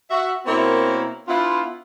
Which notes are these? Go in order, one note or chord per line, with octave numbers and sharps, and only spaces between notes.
F#4 E5
B2 A#3 C4 E4 A#4 C#5
B3 D4 E4 F4